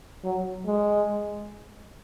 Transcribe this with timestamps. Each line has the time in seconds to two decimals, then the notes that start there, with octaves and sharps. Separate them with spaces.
0.24 F#3
0.66 G#3